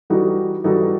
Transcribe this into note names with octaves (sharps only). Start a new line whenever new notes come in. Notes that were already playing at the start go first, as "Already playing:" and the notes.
E3 G3 D#4 F#4 A4
E3 G3 D#4 F#4 A4